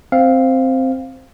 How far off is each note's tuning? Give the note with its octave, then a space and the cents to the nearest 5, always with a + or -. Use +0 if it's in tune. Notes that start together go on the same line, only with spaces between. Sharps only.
C4 +0 F5 +0